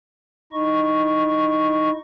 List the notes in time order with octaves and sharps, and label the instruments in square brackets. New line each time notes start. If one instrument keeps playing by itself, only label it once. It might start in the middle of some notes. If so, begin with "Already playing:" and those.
[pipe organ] D#4 E4 D#5 C#6